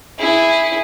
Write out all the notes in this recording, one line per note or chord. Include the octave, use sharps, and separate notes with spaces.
E4 G#4